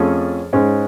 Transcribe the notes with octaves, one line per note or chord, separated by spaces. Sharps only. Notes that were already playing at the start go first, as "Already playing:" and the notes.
Already playing: F2 F3 A3 C#4 G#4
G#2 G#3 C#4